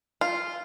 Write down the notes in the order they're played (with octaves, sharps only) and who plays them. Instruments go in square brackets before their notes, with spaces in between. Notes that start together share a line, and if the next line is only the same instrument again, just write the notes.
[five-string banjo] F4